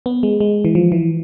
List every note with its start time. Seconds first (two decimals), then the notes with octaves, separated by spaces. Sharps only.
0.06 B3
0.23 G#3
0.40 G#3
0.65 E3
0.75 F3
0.92 E3